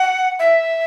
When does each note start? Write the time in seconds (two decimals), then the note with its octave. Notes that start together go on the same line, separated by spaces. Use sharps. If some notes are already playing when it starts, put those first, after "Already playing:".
Already playing: F#5
0.39 E5